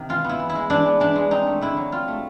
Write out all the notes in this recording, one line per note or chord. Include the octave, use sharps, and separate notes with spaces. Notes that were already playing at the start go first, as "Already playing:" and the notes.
Already playing: C3 D#3 A#3
E3 F4
B3
E4
E3
E4
G#3
E3 D4
B3
E3 D4
G#3
C4 D#4
A3
D3 E4
F#3
C4 F4
A3